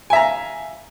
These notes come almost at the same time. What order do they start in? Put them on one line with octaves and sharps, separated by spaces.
G#5 E5 A#5 F5